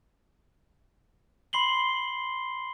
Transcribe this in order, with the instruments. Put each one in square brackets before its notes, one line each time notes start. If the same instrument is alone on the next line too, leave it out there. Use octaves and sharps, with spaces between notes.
[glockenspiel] B5 C6 C7 F#7 G7